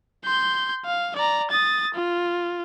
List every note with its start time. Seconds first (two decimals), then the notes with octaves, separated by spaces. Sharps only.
0.24 C6 G6
0.86 F5
1.16 D5 A#5
1.50 D#6 A6
1.94 F4